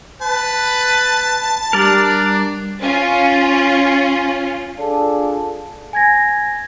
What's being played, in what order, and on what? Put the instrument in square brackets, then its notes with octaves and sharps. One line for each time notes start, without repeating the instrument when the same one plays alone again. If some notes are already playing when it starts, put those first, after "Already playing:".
[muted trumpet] B4 [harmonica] A5
[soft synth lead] G3 [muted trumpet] D4 [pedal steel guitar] A#4 D5
[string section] C#4 F4
[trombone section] D4 F4 G#4 A4
[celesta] G#5 G#6 A#6